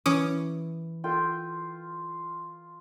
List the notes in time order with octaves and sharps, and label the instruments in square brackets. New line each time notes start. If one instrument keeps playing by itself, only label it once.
[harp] E3 [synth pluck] C#4 D6 D#6
[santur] F4 [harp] A4 G5